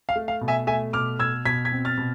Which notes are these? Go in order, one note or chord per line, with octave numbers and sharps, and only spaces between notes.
F5
A3
F5
B2
E5 G#5
A3 E5 G#5
B2 D6 F6
B2 E6 G#6
B2 G#6 B6
G#6 B6
C4
F6 A6
B2